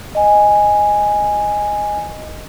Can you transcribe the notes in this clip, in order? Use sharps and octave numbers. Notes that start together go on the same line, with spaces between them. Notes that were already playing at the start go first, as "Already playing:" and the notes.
D#5 G#5